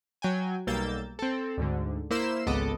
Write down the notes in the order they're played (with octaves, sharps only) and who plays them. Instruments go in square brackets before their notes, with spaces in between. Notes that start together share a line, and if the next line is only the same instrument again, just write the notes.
[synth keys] F#3 G5 G#5
B1 G3 A#3 E6 G6 A6
C4 A4
D2 G#2 D3
A#3 E4 C5 C6 E6 E7
G#1 C#2 B3 A4 D#5 D6